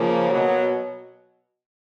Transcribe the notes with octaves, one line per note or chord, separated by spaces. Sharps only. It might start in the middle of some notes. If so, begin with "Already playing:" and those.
Already playing: C#3 F3 A#3
B2 F#3